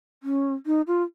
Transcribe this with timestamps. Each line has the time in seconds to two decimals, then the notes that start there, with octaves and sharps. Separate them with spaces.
0.23 C#4
0.66 D#4
0.87 F4